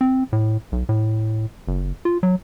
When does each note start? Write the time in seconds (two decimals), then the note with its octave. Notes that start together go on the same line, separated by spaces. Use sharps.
0.01 C4
0.33 A2
0.72 B1
0.89 A2
1.67 F#1
2.05 F4
2.23 F#3